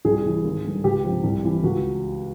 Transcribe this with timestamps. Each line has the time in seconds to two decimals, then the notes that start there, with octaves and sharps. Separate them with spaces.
0.05 C2 G#4
0.25 C3 E3
0.44 G#1
0.64 G2 D3
0.84 C#2 G4
1.04 C3 F3
1.24 C2
1.43 C3 E3
1.63 C#2 F#4